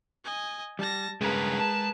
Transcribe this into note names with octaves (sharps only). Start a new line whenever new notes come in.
D#5 G#5
G3 A5 A#6
G2 C#3 G#3 G#4 A#4 B4
A5